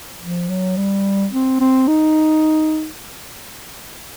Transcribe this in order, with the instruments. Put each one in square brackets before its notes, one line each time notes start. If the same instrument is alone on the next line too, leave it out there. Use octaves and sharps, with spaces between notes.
[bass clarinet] F3
F#3
G3
C4
C4
D#4